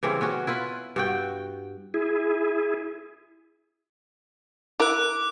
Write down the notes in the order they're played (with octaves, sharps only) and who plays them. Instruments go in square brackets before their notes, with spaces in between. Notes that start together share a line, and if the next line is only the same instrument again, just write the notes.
[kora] C#3 E3 G3 C4
B3 C#4 F#4
E4 F4 B4
G2 F#4 G5
[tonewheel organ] E4 G#4
[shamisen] E4 A#4 [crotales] D6 F#6